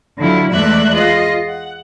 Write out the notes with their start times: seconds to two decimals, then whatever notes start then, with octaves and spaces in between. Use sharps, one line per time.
0.17 D3 F#3 E4 F4
0.51 E2 G#3 A3 D5 E5 F#6
0.93 F4 G#4 D#5
1.48 F#5